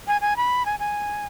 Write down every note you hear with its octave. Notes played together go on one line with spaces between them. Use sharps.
G#5
G#5
B5
G#5
G#5